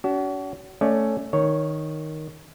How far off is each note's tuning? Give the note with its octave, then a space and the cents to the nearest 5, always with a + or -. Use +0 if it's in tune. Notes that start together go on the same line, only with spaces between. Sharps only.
C#4 +45 F#4 +35
A3 +5 C#4 +0 D5 +15
D#3 +0 C#5 +5